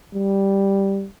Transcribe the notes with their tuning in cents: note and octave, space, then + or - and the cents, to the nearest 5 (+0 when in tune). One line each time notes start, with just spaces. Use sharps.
G3 +0